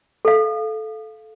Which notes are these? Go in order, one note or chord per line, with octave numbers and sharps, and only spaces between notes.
A4 F5